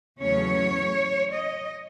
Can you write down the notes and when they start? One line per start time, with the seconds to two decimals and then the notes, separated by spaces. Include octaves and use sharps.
0.20 E2 C#3 F#3 A3 C#4 C#5
1.34 D#5